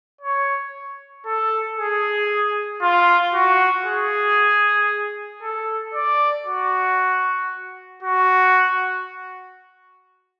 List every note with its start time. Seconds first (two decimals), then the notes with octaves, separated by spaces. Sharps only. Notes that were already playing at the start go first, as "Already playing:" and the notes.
0.21 C#5
1.26 A4
1.77 G#4
2.82 F4
3.34 F#4
3.86 G#4
5.42 A4
5.94 D5
6.46 F#4
8.02 F#4